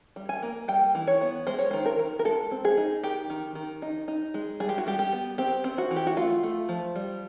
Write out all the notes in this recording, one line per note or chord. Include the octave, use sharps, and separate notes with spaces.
G3
G#5
A#3
G3 G5
E3
C#5
B3
G#3 C5
C#5
D#3 C5
A#4
D#3
A#4
G#3 A4
C4
G#4
D#4
D#3 G4
D#3
D#3
D#4
D#4
G#3
G3 G#4
G4
F#4
G3 G4
G4
B3
C4 G4
C4
F#4
E3
G4
F#4
A3 F4
A3
F3
G3